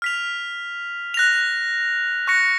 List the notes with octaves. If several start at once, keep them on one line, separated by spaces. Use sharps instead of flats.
F6 B6 F7
F#6 A#6 F7
C#6 F#6 A#6 C#7